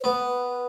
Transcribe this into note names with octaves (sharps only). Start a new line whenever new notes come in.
C5
B3 B4